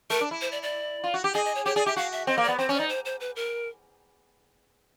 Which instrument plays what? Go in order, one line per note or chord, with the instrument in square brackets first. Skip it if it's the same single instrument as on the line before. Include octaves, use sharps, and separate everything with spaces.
[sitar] A3 [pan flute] A#4
[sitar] D4
E4
[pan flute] C5
D5
D5
[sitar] F4
F#4
G4
[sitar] G#4 [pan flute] D#5
[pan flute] D#5
C#5
[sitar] G4 [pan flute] C#5
[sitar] G#4 [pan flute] D5
[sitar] G4 [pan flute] E5
[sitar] F#4 [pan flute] F5
[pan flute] E5
[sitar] C4 [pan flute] D#5
[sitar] A#3
[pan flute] D5
[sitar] B3
[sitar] C4 [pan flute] C5
[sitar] C#4 [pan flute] C#5
[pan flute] D5
[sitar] D#4
[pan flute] C5
C5
B4
A#4